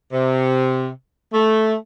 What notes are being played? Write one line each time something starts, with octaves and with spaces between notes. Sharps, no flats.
C3
A3